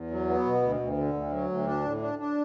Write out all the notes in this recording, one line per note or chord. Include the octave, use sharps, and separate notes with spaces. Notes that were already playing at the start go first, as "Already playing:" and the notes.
Already playing: E2
F#3
B3
B2
D2
D2
D3
D2
F#3
D2
D4
A2
D4
D4